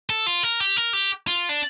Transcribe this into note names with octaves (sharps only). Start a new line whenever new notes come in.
A4
F4
A#4
G4
A#4
G4
F4
D4